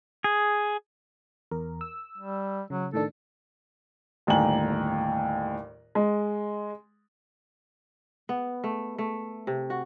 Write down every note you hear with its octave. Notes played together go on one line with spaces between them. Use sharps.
G#4
E2 A#4
E6
G3
C#3 F#3
A2 D#3 D4 A4
G1 D#2 A2 G#5 A#5 F#7
G#3
B3
A3
A3
C3
F#4